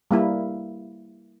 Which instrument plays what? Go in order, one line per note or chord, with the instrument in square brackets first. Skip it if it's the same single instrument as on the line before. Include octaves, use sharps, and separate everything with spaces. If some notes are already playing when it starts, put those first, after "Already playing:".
[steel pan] G3 A#3 E4